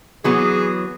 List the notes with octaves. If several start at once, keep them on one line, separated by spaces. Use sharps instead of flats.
E3 F#3 B3 G#4